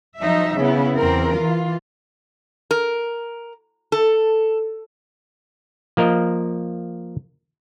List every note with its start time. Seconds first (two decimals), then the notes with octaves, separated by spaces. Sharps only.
0.18 F3 F#3 D#4 E5
0.56 C#3 B3 E4
0.96 E2 C4 A#4
1.33 E3 F4
2.71 A#4
3.92 A4
5.97 F3 A#3 A#4 D#5